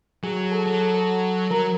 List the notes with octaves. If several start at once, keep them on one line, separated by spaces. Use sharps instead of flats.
F#3 G#4 G#5
G#4 G#5
A4 A5
F#3 A4 A5
A4 A5
A4 A5
F#3 A#4 A#5